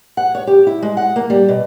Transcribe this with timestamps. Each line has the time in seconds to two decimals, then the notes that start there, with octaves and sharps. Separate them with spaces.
0.17 F#5
0.35 C#5
0.47 G4
0.67 E4
0.82 G#3
0.97 F#5
1.16 A#3
1.30 G3
1.48 B2